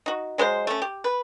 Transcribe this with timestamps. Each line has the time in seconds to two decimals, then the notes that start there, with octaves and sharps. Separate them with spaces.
0.06 D#4 F#4
0.38 F#3 G#3 B4 C5
0.67 A3 C#4
0.82 G4
1.04 B4